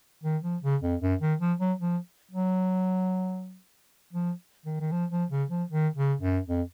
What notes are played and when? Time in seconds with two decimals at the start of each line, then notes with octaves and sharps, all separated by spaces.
0.24 D#3
0.43 F3
0.63 C#3
0.82 F2
1.01 F#2
1.21 D#3
1.40 F3
1.60 F#3
1.79 F3
2.32 F#3
4.13 F3
4.66 D#3
4.81 D#3
4.92 F3
5.11 F3
5.31 C#3
5.50 F3
5.70 D#3
5.96 C#3
6.21 F#2
6.48 F2